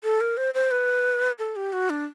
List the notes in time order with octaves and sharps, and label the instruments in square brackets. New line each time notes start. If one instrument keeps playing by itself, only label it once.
[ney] A4
A#4
C5
C5
B4
A4
G4
F#4
D4